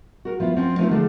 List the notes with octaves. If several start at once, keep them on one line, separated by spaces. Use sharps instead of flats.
F#4 A#4
F3 B3 E4 F4
F3 C4 C#4
F3 A3 B3 D#4 F4
D3 F3 G#3 A3 D4